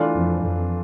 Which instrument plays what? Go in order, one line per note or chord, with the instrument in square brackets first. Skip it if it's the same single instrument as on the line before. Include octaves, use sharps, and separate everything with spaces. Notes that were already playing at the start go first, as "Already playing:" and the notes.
Already playing: [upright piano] E3 A3 D4 F4
[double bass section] F2
F2